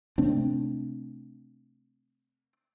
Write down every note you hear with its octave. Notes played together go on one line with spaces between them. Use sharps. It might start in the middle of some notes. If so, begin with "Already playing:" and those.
C3 A3 C4 D4